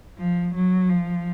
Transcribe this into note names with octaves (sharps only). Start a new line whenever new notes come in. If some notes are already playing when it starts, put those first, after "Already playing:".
F3
F#3
F3